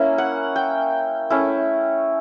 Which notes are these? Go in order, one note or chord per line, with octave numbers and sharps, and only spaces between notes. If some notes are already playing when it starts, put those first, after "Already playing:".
Already playing: A#3 C#4 E4
F#5
G5
A3 C#4 E4